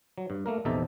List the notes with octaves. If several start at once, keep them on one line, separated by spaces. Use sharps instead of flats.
F#3
G2
A3 A#3 A#4
A#1 E2 C3 D#4 A4 E5